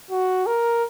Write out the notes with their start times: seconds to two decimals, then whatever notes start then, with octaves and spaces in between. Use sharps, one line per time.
0.11 F#4
0.46 A#4